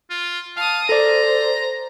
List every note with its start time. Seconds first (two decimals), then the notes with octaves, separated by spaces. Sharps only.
0.10 F4
0.56 F5 A5 D#6
0.89 A4 C5 D5 A#5